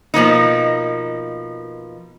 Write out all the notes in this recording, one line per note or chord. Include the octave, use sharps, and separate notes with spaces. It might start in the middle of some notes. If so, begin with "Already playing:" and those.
B2 F3 A#3 D#4